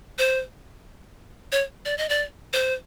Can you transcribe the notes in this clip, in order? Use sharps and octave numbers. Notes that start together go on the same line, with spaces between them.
C5
C#5
D5
D#5
D5
C5